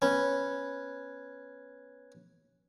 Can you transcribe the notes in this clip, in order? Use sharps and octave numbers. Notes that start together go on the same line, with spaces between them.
B3 C#4